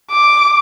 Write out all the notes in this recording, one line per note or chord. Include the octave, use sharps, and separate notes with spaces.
D6